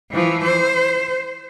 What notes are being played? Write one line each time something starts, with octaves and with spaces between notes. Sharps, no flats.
E3 F3
C5